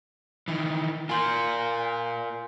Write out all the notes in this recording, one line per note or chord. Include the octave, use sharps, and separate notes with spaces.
D#3 E3
F4 A#4 G#5 C6 G6